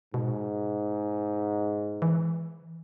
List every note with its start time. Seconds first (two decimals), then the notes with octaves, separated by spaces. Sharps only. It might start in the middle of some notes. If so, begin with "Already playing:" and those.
0.14 G#2 B2
2.02 E3